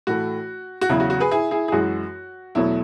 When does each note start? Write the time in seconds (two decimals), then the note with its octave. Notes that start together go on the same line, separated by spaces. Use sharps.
0.07 A2 E3 A3 F#4
0.81 F#4
0.89 E2 C#3 F#3 E4
1.00 F#4
1.10 F#4
1.20 G#4 B4
1.31 E4 G#4
1.51 E4 G#4
1.68 G#4
1.72 F#2 E3 G#3 F#4
2.55 E2 B2 F#3 A3 E4